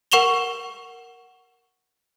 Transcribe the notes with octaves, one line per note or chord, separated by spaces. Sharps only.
A#4 F#5 C#6 E7 F7 G7